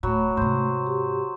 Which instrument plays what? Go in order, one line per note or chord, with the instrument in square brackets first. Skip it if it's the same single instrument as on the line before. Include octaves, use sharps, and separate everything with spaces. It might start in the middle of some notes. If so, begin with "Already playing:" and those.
[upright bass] D1 A2 [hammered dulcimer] F#3 [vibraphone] A3 B5
[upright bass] G#2 C3 [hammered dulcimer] C5
[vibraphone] G4